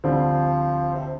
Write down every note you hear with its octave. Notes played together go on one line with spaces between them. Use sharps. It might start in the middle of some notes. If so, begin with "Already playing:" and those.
D2 D3 F3 G3 C4
C3